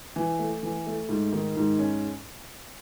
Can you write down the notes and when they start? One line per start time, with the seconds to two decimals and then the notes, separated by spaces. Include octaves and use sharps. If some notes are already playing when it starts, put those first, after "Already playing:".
0.16 E3
0.39 A3
0.63 E3
0.87 A3
1.09 G#2
1.32 D#3
1.56 G#2
1.79 C#4